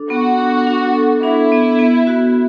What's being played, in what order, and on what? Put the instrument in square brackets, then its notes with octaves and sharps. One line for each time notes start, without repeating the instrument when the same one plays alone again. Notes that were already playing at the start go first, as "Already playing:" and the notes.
Already playing: [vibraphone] D4 A4
[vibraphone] B3 [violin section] F#4
[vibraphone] D4
D4
A4
[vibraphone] D4 [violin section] E4
[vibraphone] B3
B3
F#4